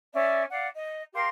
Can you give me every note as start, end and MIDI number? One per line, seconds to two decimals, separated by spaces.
0.12 0.43 61
0.12 0.43 74
0.12 0.43 76
0.50 0.68 74
0.50 0.68 77
0.50 0.68 78
0.73 1.01 75
1.13 1.27 67
1.13 1.27 70
1.13 1.27 77
1.13 1.27 84